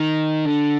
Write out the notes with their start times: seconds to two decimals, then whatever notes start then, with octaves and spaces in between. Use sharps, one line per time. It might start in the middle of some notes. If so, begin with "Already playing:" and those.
Already playing: D#3
0.45 D3